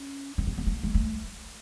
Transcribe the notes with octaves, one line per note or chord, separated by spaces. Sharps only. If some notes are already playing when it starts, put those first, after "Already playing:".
Already playing: C#4
C4
B3
B3
A#3
G#3
A3